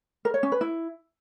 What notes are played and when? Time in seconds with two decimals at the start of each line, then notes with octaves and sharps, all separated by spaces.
0.25 A#4
0.34 C#5
0.43 C#4
0.52 B4
0.61 E4